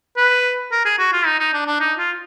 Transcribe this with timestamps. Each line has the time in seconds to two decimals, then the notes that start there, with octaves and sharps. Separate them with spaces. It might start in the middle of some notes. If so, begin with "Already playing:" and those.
0.17 B4
0.72 A#4
0.85 G#4
0.99 F#4
1.13 F4
1.26 D#4
1.40 D#4
1.54 D4
1.67 D4
1.80 D#4
1.98 F4